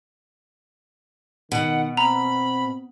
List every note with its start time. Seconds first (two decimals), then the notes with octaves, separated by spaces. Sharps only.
1.52 B2 D#3 F#5
1.97 C4 A#5 B5